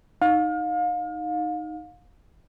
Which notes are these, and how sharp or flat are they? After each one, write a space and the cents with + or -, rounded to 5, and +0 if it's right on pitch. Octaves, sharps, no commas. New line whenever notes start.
D#4 +0 F5 +35